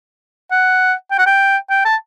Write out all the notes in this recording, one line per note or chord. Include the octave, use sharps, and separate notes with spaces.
F#5
G5
F#5
G5
G5
A5